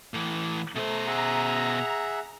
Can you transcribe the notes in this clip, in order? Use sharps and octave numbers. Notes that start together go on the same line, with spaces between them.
A2 E3
B2 A3 C5 A#5
G#4 E5 F#5